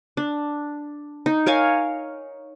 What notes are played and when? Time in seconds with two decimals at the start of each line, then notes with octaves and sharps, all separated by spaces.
0.17 D4
1.26 D#4
1.46 A#4 C#5 F5 G#5